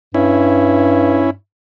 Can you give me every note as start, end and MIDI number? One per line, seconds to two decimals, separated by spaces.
0.14 1.34 43
0.14 1.30 61
0.14 1.30 64